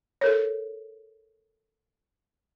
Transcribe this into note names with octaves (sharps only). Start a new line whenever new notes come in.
A4 A#4 C#5